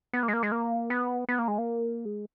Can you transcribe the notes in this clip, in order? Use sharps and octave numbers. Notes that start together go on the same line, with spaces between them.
B3
A#3
G#3
A#3
G#3
A#3
B3
B3
A#3
G#3
A#3
G#3